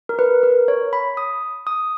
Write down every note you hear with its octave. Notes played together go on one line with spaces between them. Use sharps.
A#4
B4
A#4
C#5
B5
D#6
D#6